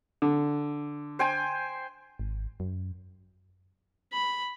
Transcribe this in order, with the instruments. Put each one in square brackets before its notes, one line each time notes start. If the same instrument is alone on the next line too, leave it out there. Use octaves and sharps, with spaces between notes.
[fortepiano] D3
[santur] C5 G5 G#5
[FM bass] G#1
F#2
[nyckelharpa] B5